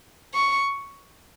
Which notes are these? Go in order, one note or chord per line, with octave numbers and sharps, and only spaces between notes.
C#6